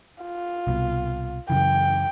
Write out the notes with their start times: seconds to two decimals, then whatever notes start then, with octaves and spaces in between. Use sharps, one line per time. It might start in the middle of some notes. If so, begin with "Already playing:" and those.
0.23 F4
0.67 C2 B2
1.50 F#2 C#3 E3 G5